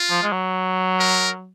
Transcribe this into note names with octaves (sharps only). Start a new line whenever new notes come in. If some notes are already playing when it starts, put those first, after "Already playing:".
Already playing: F4
F3
G#3
F#3
A#4